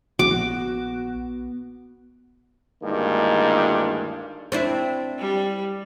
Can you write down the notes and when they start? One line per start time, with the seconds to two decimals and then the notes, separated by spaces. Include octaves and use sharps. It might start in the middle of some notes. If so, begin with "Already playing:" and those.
0.19 A#1 B3 F#4 D6
2.83 D2 G2 D#3 G#3 A#3 E4
4.52 C4 D4 E4
5.19 G3